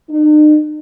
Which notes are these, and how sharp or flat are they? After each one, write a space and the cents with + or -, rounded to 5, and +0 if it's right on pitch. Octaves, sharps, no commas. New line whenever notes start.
D#4 -45